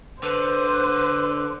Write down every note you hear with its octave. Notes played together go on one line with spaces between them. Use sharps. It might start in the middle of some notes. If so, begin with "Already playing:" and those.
D3 B4 C5